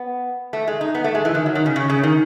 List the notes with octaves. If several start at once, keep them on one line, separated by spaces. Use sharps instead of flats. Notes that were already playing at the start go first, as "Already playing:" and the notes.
Already playing: B3
A3
G#3
D#4
B3
A3
G#3
E3
D#3
F#3
D#3
C#3
C#3
C#3
D#3